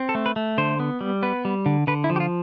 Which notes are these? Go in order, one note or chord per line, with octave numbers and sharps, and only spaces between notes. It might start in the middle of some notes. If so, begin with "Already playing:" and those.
Already playing: C4
A4
A3
B4
A3
D3 C5
B3
G3
B3 B4
G3
D3
D3 B4
E4
F3
G4
F4